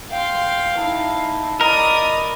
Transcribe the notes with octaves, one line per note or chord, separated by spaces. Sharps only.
F5 G5 C6
D#4 E4 A5
A#4 D5 D#5 B5 D#6